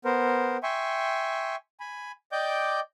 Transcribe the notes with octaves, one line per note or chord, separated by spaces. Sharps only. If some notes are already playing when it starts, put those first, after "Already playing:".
B3 A#4 C5
E5 G5 G#5 C6 C#6
G#5 B5
D5 D#5 G5 D6 G6